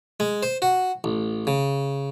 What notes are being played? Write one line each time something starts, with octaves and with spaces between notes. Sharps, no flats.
G#3
C5
F#4
A1
C#3